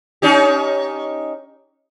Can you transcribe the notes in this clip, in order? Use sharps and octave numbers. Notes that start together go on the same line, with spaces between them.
C#4 D#4 G4